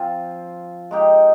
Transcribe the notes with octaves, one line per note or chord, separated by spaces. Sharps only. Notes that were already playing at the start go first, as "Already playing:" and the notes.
Already playing: F3 C4 F4
G#3 D#4 G4